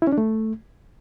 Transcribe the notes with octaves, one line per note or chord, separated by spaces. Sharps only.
E4
C#4
D4
A3